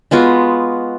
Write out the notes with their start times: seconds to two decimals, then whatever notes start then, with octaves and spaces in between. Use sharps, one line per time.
0.11 G#3 B3 F4 F#4